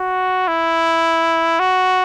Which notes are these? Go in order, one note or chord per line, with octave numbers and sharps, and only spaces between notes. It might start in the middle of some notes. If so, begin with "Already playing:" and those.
Already playing: F#4
E4
F#4